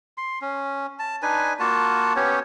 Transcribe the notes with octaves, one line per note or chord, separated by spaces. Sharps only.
C6
C#4
A5
D4 D#4 B4 G#5
A#3 F4 F#4 A5
B3 C#4 G4 C#5